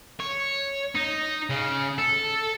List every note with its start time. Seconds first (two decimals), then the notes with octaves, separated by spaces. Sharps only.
0.20 C#5
0.95 D#4
1.50 C#3
1.98 A4